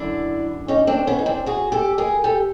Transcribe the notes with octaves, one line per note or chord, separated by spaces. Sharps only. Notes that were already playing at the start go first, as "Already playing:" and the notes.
Already playing: F#2 D3 D4 E4
C#4 D#4
C4 D4
B3 C#4
D#4
C4 D4
F#4 G#4
G4 A4
G#4 A#4
G4 A4